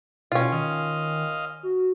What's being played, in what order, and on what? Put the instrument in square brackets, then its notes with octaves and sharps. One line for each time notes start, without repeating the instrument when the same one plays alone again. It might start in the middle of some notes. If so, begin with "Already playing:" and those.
[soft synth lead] B2 [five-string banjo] C#4 F4
[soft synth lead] D#3 [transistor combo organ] D#5 F5
[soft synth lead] F#4